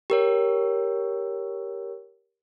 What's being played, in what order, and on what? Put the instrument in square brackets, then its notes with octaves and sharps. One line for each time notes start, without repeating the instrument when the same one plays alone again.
[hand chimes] G4 A#4 C#5